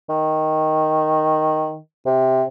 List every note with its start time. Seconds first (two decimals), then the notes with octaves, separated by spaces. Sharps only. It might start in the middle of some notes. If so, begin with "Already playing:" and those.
0.09 D#3
2.06 C3